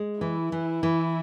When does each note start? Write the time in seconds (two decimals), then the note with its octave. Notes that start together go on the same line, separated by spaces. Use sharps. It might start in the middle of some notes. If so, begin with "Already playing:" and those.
Already playing: G#3
0.21 E3 E4
0.52 E3
0.83 E3